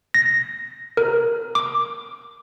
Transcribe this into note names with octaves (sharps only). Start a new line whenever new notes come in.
A#6
A#4
D6